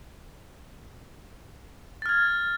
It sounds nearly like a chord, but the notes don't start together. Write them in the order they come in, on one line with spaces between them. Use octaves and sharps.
A6 F6 G#6